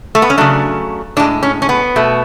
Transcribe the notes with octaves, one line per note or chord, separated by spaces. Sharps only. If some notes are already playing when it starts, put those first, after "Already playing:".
A3
B3
C#4
C#3 F#3 A3 D4
A2 G#3 D4
C#4
C#4
B3
B2 A3